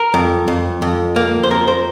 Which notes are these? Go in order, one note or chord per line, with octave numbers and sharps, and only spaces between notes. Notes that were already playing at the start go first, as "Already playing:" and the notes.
Already playing: A#4
F2
F2
F2
A#3
C5
F2 A#4
C5